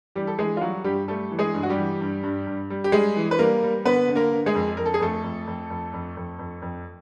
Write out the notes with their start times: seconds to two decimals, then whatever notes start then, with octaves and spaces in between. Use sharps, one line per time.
0.15 E3 G3 G4
0.27 A4
0.38 E3 G#3 G#4
0.57 F4
0.61 F#3 G3 F#4
0.84 G2 G3 G4
1.08 G3 A3 A4
1.31 E3
1.39 G#3 G#4
1.54 G2
1.63 F#4
1.70 G3 G4
1.77 E3
2.01 G2
2.23 G2
2.47 G2
2.70 G3
2.84 G4
2.92 G3 G#3 G#4
3.16 E3
3.31 B4
3.39 G3 A#3 A#4
3.63 G3
3.85 D3 B3 B4
4.08 D3
4.15 A#3 A#4
4.32 D3
4.46 G#3 G#4
4.55 F2
4.77 F2 A#4
4.86 A4
4.94 G#4
5.00 F2 A3 A4
5.24 F2
5.47 F2
5.70 F2
5.93 F2
6.17 F2
6.39 F2
6.62 F2